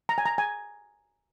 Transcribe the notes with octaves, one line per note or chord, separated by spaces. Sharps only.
A#5
G#5
A#5
G#5